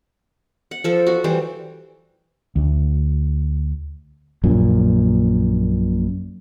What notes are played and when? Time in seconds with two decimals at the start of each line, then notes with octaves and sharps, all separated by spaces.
0.71 F#5
0.84 F3 A4
1.07 F#4
1.24 E3 G3 C5
2.56 D2
4.43 A#1 F#2 A#2